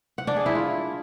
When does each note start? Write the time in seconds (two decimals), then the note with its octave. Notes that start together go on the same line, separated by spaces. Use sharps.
0.18 F#5
0.27 D4
0.37 G#4
0.46 E4
0.55 F4